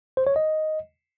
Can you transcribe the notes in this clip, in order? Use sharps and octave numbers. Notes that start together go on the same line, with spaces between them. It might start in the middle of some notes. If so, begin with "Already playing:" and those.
C5
C#5
D#5